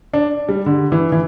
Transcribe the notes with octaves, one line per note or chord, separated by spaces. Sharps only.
D4
G3
D3
E3
E3